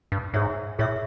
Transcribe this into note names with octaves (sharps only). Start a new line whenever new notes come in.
G2
G#2 G#4 C#5 E5
A2 G#4 C#5 E5